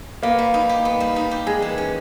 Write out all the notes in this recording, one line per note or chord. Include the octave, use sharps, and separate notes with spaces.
A#3 B3
G3
D#4
G4
B3
G3
D#4
G4
G#3 G#4
E3
C#4